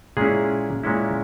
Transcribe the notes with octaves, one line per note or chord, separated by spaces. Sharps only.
A#2 G#3 C#4 E4 G#4
A#2 G#3 C#4 E4